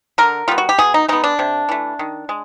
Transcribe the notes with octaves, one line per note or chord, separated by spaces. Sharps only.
D3 A#4
G3 B3 F4
F#4
G4
B2 G#4
D#4
G#3 B3 D#4
D4
C3
E3 A3
D#3
G#3